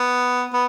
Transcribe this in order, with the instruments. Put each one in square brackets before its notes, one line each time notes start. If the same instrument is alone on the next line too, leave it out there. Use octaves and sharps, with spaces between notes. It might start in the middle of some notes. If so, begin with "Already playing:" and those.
Already playing: [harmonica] B3
B3